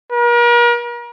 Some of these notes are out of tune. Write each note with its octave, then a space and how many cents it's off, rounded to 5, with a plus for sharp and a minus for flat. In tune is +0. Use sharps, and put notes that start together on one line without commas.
A#4 +40